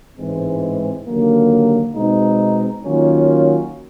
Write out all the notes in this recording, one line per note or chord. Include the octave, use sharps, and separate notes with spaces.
A1 G#2 E3 G#3 C4
D#2 D3 F#3 A#3
B2 G#3 C4 D#4
D#3 F#3 A#3 C#4 F4